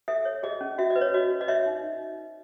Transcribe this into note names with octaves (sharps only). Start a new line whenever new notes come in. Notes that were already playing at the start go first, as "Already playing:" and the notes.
A4 E5
C#5
G#4 D#5
C#4
F#4 E5
D#5
B4
C#5
F#4 D#5
B4
D#5
C#5 E5
D#4